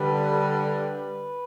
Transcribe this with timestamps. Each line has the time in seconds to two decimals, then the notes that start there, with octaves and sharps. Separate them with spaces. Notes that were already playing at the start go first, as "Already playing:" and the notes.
Already playing: D3 G3 B4
0.48 B4